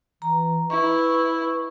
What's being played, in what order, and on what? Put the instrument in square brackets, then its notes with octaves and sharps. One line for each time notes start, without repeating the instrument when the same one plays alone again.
[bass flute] E3 [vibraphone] A#5
[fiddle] E4 [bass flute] B4 [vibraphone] C#6